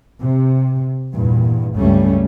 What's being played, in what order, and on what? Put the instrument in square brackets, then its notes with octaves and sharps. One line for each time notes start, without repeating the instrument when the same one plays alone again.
[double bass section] C3
E2 G2 A#2
C#2 G2 G3 A3 C#4